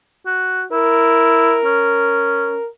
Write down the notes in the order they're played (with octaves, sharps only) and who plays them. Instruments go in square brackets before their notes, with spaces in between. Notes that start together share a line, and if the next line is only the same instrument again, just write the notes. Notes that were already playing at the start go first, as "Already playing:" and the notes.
[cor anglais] F#4
[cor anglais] E4 [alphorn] A#4
[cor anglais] C#4